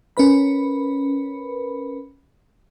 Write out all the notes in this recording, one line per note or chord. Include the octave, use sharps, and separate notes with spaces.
C#4 A#4 B4 B5